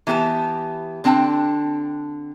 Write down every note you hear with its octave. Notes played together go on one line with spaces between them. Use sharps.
E3 B3 G4 A#4 A5
D3 C4 D4 G5 A5